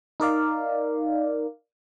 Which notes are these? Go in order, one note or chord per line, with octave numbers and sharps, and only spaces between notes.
D#4 A#4 D5 F5